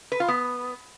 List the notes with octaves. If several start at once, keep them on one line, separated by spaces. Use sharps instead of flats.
B4
F4
B3